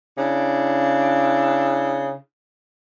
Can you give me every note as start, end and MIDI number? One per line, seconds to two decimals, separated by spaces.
0.18 2.15 49
0.18 2.15 62
0.18 2.15 64